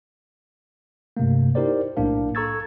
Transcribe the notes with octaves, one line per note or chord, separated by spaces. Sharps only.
G2 C3 A3 A#3
D#4 E4 G4 A#4 C5 D5
B1 A2 A#3 D4 A#4 F5
A4 A#5 C#6 E6 G#6 A6